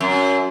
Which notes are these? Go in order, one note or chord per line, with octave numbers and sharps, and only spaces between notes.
F#2